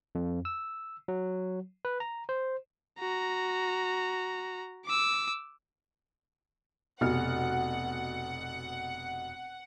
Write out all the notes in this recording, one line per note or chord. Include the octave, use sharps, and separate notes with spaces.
F2
E6
F#3
B4
A#5
C5
F#4 A#5
D6 E6
F1 B2 F#5 F6